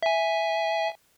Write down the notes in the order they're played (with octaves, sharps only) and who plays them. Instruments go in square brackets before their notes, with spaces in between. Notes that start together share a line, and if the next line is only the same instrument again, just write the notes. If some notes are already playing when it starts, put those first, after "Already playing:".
[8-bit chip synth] E5 G#5